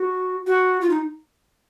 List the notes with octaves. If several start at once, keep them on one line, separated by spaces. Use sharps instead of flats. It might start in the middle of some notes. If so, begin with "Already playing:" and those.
Already playing: F#4
F#4
F4
D#4